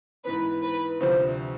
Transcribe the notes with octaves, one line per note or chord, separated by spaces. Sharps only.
G#2 E3 B3 B4
B4
D2 C3 F3 C5